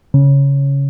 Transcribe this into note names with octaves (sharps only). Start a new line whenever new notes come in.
C#3